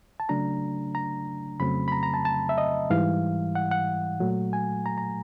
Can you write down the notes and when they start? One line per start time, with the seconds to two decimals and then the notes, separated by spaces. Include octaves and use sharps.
0.20 A5
0.29 C#3 F#3 A3 D4 A#5
0.95 A#5
1.60 F2 C#3 F#3 A3 C4 B5
1.88 B5
1.92 A#5
2.03 A#5
2.14 A5
2.25 A5
2.49 E5
2.58 D#5
2.90 G#2 E3 G3 F5
3.55 F#5
3.72 F#5
4.20 A#2 F#3 A3
4.53 G#5
4.86 A#5
4.98 A#5